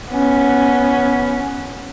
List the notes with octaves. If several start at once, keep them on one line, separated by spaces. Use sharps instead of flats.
B3 C#4